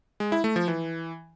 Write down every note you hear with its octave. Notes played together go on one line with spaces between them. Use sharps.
G#3
E4
A3
F3
E3